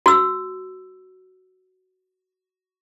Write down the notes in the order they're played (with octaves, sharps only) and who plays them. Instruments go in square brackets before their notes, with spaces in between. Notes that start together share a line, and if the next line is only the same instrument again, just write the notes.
[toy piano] F#4 E6